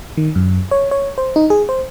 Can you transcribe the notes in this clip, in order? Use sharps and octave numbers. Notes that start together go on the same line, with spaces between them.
D#3
F#2
C#5
C#5
C5
D#4
G#4
C5